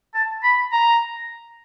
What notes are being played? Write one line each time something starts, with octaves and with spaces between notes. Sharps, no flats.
A5
B5
A#5